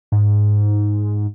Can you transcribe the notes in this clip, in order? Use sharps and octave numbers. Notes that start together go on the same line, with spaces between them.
G#2